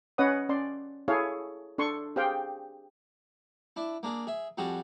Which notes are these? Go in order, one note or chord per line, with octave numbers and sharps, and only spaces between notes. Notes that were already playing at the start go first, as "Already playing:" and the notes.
C#4 B4 C#5 D#5 F#5 D#6
C#4 D5 C6
E4 G#4 A4 C#5 F5
D4 A4 C6 C#6
G4 G#4 C5 F5 G5
D4 E4
A#3 D4 G#4
G#4 E5
F2 G3 F#4 G#4 A5